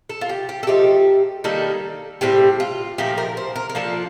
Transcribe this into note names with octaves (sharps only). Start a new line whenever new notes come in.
A4
F4
G4
G4
A4
F3 A3 D#4 G4
D#3 G3 A#3 D#4 A4
A2 G3 C4 G4
F4
A#2 F3 A3 D#4 G4
A#4
C5
A#4
A#4
F3 A#3 D4 F4 A4